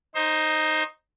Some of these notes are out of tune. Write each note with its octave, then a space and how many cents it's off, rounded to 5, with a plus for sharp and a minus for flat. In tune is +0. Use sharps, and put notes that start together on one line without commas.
D#4 +0 C5 +20